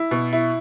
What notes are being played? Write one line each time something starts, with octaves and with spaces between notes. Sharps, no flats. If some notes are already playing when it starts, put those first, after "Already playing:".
Already playing: E4
B2
E4